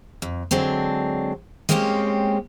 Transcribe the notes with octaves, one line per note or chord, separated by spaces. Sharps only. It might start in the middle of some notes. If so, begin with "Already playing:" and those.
F2
D3 F#3 G#3 C4 D4
G#3 A#3 C4 C#4 E4 G4